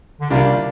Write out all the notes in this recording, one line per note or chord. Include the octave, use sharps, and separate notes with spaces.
D3
C2 C3 G3 A#3 D4 F4